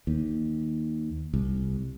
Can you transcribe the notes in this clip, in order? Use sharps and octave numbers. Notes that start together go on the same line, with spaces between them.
D#2
C2